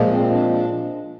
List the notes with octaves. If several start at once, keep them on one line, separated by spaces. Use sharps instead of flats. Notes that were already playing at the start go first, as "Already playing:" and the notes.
Already playing: A#2 F3 G#3
C4
D4
D4